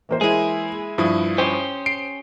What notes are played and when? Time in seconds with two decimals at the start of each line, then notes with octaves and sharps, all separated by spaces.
0.09 E3 A#3 C5
0.21 G#3 E4 G#4
0.98 G2 F3 E4 D#6
1.38 C#4 G4 C5
1.86 C7 D7